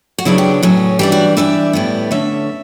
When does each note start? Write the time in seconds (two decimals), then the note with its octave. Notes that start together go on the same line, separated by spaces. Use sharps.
0.18 F#4
0.25 C#3 F#3 B3 D4 E4
0.38 G4
0.63 A2 F#3 C#4
0.99 E3 G3 D4 G4
1.12 F#4
1.37 E3 G3 D4 E5
1.73 A2 G3 B3
2.11 D3 A3 C#4 E5